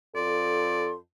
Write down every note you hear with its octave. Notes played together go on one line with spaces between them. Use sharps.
F2 A4 D5 C6